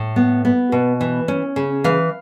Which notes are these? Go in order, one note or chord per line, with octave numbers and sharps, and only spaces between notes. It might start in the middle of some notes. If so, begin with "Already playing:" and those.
Already playing: A2
B3
B3
B2
E3
C#4
C#3
E3 F5